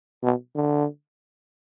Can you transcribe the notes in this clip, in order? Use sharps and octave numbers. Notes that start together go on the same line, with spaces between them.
B2
D3